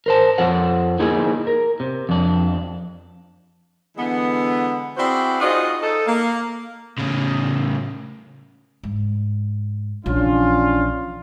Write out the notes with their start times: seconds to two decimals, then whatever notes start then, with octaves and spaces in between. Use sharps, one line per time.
0.06 A#4 C5 A5
0.38 F2 F4 A4 C5 F#5
0.99 A#3 D#4 E4 G#4
1.47 A#4
1.80 C3
2.09 F2 D4
3.97 D3 E3 G#3 B3
4.97 C4 E4 F#4 G#4 C5 D5
5.40 D#4 F4 F#4 G#4 C5 D#5
5.81 D#4 A4
6.06 A#3
6.99 A2 C#3
8.83 G#2
10.06 A#1 E3 C#4 D4 F4